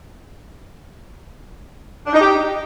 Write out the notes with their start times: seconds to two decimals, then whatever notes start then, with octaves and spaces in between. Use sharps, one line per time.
2.06 D4
2.13 D#4
2.21 G4